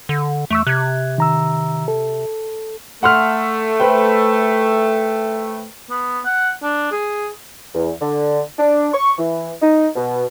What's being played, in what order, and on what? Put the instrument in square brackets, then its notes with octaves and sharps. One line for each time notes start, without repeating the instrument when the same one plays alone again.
[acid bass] D3
[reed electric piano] E2 C#6 E6 [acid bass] A3
[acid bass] C3 [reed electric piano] F#6 G#6
[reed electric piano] D#3 A#5 E6
A4
[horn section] A3 [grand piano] F#5 C6 F6
[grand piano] B4 C5 G5
[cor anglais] B3
F#5
D4
G#4
[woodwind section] E2
D3
D4
C#6
E3
D#4
B2